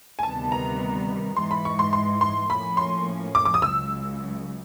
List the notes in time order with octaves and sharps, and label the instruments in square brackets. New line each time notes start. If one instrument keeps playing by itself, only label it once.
[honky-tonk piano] G#5
[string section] D2 C3 D#3 G3 B3 [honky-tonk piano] A5
[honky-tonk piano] A#5
[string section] G#2 E3 G#3 [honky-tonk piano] C6
[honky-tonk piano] B5
C#6
C6
C6
C6
[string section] A2 F3 A#3 C#4 [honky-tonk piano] B5
[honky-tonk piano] C6
D6
D6
D#6
[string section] C#2 C#3 F#3 [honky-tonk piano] E6